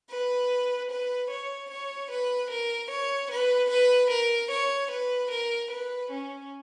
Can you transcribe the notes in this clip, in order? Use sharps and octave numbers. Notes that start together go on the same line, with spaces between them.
B4
B4
C#5
C#5
B4
A#4
C#5
B4
B4
A#4
C#5
B4
A#4
B4
C#4